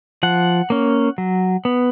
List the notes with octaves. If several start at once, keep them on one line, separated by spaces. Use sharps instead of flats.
F3 F#5
A#3 C#4
F#3
B3